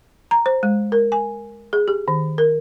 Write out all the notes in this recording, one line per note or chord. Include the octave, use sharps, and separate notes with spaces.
A#5
C5
G#3
A#4
G#5
G#4
G4
D#3
A#4